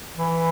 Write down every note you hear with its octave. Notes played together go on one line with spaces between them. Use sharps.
E3